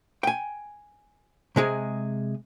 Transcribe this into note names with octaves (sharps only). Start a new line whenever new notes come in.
G5 G#5
C3 G#3 G#4